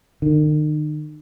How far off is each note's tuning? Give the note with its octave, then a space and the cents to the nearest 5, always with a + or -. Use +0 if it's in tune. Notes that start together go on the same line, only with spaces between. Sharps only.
D#3 -40